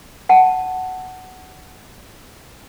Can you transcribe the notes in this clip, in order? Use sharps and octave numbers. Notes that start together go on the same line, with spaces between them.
F#5 A5